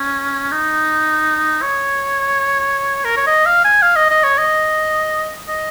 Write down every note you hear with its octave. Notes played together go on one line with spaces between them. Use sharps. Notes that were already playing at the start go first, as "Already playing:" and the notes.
Already playing: C#4
D#4
C#5
A#4
C#5
D#5
F5
G#5
F5
D#5
D#5
C#5
D#5
D#5